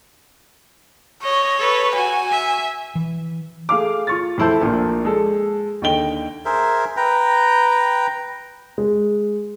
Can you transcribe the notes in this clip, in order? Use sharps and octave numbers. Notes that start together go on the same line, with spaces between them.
C#5 D#5
A4 B4
F#4 G#5
E5
E3
A3 G#4 F5 D6
F4 C#6 A6
F2 A3 E4 C5 A5 G6
A#1 A#2 A#3 D4
G#3 A4
D#2 D3 D#5 G5 G7
G#4 A#4 C5 E5
B4 G5 A#5
G#3